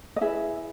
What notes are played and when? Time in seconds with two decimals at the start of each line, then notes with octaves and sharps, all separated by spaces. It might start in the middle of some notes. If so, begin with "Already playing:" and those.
0.16 D#5
0.21 E4 G#4 B4 E5